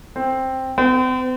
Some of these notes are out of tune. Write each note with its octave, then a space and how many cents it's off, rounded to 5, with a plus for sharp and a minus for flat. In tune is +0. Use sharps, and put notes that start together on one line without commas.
C4 +5
C4 -40